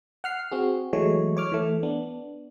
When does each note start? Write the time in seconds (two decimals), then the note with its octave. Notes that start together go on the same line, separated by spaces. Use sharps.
0.24 F#5 F6 C7
0.51 C4 F#4 G#4
0.93 E3 F#3 G#3 A3 C#5
1.37 C#5 D6 F6
1.52 E3 A3
1.83 B3 D4